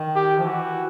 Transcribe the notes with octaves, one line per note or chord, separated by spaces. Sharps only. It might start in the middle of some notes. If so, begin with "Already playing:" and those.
Already playing: D#3
G4
F3
E3 F#4